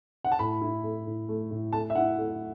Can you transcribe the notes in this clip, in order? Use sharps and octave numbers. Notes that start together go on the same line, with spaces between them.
F#5
A5
A2 B5
E4
A3
A2
A3
A2
A3 A5
E5
E4 F#5
A3